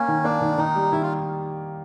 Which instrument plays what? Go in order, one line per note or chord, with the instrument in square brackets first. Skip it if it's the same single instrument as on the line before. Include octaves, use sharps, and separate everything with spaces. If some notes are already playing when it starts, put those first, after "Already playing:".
Already playing: [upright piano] A#3 [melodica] C#4
[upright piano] D#3
[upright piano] A#3 [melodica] D4
[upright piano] D#3
[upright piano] D#3 [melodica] D#4
[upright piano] G3
[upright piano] D#3 [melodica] E4
[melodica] F4